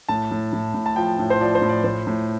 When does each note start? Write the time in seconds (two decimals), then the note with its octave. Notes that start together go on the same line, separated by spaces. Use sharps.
0.09 A2 A5
0.31 A2
0.53 A2
0.74 A2
0.86 A5
0.96 F3 G5
1.19 A2
1.30 C5
1.41 F3 D5
1.55 C5
1.62 A2
1.69 D5
1.84 A2 C5
2.07 A2